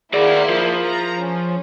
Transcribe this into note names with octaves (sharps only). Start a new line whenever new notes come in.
A#3 E4 F#4 G#4 C5 D5
F3
A#5
C#4